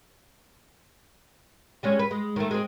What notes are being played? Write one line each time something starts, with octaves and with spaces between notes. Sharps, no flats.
G3 G#3 C#4
B4
G#3
D#3 A3
G#3 C4